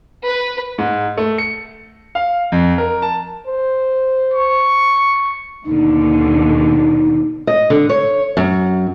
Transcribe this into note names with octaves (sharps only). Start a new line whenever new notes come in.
B4
G#2
A3
C#7
F5
F2
A#4
A5
C5
C#6
D#2 B2 D3 D#4
D#5
D3
C#5
F#2